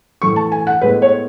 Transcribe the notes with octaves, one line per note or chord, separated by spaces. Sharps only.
A2 E3 A3 C#6
A5
G#5
F#5
A2 G#3 B3 B4
C#5